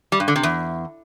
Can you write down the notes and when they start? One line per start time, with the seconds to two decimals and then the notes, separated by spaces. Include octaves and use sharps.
0.12 G3
0.20 G2
0.28 D3
0.36 C3
0.43 E2